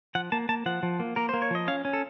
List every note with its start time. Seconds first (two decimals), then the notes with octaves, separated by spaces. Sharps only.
0.15 F3 F#5
0.32 A#3 A5
0.49 A#3 A5
0.66 F3 F#5
0.83 F3
1.00 A#3
1.16 A#3 A#4
1.29 A#3 C5
1.42 C#5
1.51 F3 D#5
1.68 C#4 F5
1.85 C#4
1.93 A4